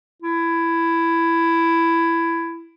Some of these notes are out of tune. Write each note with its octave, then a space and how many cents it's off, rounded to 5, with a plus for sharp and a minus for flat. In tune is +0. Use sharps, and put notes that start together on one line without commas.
E4 +15